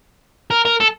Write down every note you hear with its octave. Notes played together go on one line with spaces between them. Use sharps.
A#4
A#4
A4